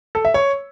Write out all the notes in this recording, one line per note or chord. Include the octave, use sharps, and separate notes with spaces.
A4
E5
C#5